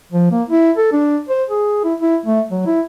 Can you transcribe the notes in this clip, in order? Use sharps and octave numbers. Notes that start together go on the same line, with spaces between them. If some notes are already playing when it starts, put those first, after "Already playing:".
F3
A#3
E4
A4
D4
C5
G#4
E4
E4
A3
F#3
E4